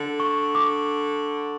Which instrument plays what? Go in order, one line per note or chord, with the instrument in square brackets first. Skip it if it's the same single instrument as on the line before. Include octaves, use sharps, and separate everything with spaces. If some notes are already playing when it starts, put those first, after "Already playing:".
Already playing: [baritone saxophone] D3
[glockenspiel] C#6
D6